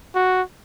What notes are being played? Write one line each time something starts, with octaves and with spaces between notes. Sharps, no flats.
F#4